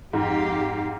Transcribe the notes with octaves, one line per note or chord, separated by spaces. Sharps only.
F2 G#2 G4 F5